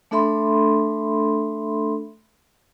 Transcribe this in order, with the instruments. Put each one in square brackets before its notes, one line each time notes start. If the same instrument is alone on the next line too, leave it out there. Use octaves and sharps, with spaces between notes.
[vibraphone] A3 D4 A4 E5 B5 C6